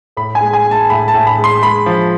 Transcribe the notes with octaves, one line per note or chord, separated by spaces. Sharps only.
A2 B5
G#5
G#3
G#5
G#3
A5
A2 B5
A5
A2
B5
G#3
C6
G#3 B5
F3